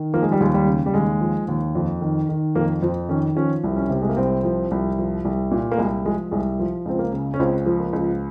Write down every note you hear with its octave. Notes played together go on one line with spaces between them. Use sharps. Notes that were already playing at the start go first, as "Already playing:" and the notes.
Already playing: D#3
F3 A#3
G#3
G3
D#2 G#3
G3
C#3
G3
D#2 G#3
F3
D#2
F2
D#3
D#3
F2 A#3
F2 C4
D#3 C#4
F3 C#4
C2
C#4
C3
G#3
A#3
C2 C4
F3
C2
F3
C2
A#2
A#3
C2 G#3
F3 G#3
C2 G#3
F3
C#2 C4
A#3
C#3
C#4
C#2 C4
F3
A#3
C#2